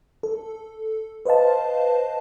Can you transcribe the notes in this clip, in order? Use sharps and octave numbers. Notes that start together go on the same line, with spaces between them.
A4
B4 C5 D#5 F5 A5